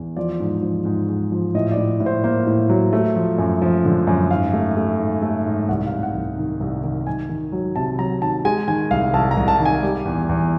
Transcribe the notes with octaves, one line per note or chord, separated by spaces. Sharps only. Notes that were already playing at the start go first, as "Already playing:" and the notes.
Already playing: E2
F3 D5
G#2
F3
G#2
G#2
F3
A2 D#5
D5
A2
A2
C5
A#3 C5
A2
F#3
A3
F3
F#2
F3
D3
F#2
G#2 F5
A3
A3
G#2
A3
G#2
C2 F#5
F5
C2
F#5
C2
D#3
C2
D#3
D#3 G#5
D#3
F#3
C3 A5
F#3 A#5
D#3 A5
G#3 G#5
D#3 G#5
C2 F5
C2 A5
A#5
C2
A5
D#3
G#5
G3
E2
E2